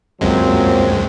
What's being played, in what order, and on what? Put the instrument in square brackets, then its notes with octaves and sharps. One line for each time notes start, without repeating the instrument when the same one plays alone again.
[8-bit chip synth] C#2 F#2 G#3 [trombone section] A#2 F#3 C4